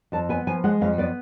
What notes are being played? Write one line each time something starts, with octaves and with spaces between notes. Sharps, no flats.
F2 A5
B3 G#5
F3 G#5
G#3 F#5
F2 F5
B3 D5